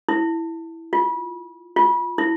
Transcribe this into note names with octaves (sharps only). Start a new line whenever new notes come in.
E4
F4
F4
E4